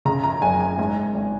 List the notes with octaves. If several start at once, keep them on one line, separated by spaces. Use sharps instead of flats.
C#3 A#5
A#5
F#1 G#5
G#5
G#2 G#5
G#1